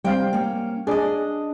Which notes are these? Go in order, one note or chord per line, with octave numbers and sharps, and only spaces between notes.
G3 C4 F5 G5
A#3 C#4
D4 G#4 D5 D#5